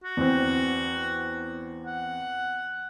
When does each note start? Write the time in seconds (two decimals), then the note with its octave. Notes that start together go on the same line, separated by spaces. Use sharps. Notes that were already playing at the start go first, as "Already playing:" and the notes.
0.04 F#4
0.17 E2 C4
1.86 F#5